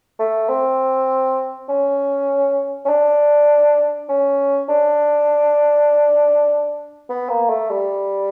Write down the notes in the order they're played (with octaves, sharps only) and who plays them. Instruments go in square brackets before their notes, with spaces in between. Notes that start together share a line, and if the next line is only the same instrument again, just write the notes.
[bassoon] A3
C4
C#4
C#4
D4
C#4
D4
B3
A#3
A3
G3